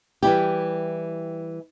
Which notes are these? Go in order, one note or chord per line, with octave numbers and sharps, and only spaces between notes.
E3 G3 E4 G4